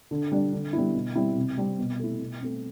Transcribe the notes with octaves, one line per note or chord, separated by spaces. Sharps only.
D3
G3 D4
D3
G3 B3 E4
B2
G3 C4 E4
C3
G3 C4
B2
A3 E4
B2
A3 C4